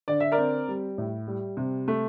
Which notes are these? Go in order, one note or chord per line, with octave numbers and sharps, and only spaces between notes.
D3 D5
E5
A#4 D5
C4
G3
A2
G3
C3
A3